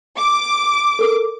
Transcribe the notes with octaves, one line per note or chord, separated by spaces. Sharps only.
D6
A4 A#4